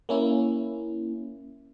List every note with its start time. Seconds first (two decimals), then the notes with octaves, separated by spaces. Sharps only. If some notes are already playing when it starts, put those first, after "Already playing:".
0.09 A#3 C#4 E4